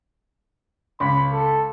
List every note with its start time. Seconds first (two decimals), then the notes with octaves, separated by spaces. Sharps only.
1.00 C#2 B5
1.32 A4